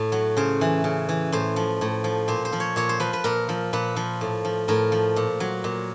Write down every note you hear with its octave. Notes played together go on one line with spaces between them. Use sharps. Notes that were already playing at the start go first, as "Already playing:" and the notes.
Already playing: A2
F#3
C#3 C5
E3
C#3
E3
A2 C5
F3
A2
F3
A#2 C5
C5
F3
C#5
A#2 C#5
C5
F3 B4
B4
A#2 A#4
F3
A#2 B4
F3
A2
F3
A2 A#4
F3
A#2
F#3
A#2